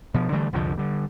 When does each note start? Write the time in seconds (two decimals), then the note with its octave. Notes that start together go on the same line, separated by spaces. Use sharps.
0.14 B2 F3
0.32 D3 E3 G3 A3
0.53 C2 F2 D3 F3
0.78 D3 G3